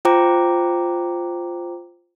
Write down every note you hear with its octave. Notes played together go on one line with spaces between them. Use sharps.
F4 C5 G5 A#5 D6